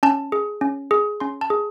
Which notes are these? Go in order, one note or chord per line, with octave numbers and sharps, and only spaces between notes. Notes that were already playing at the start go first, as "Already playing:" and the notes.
C#4 A5
G#4
C#4
G#4
C#4 C6
A5
G#4